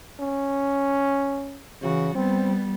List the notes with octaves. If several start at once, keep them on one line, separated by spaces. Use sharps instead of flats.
C#4
C#3 E3 F#4
G3 B3 C4